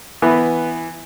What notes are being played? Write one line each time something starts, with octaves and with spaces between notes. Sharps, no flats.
E3 B3